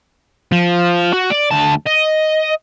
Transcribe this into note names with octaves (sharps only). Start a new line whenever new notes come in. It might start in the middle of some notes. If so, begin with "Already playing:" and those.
F3
F#4
D5
D2 A5
D#5